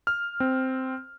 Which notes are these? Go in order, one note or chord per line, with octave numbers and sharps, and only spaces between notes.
F6
C4